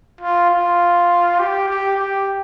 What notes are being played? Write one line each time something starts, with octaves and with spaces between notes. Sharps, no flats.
F4
F4
G4
G4
G4